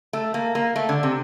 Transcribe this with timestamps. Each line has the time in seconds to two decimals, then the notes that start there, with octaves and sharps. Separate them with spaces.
0.13 A3
0.34 A#3
0.55 A#3
0.76 A3
0.89 D3
1.03 C3